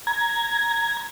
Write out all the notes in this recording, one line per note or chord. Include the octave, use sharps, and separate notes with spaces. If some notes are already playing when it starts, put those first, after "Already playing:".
A#5 G#6